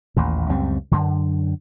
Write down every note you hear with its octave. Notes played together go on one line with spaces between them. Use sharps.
A1 D#2 A#2
C#2 F#2 G3 C4
F#2 D3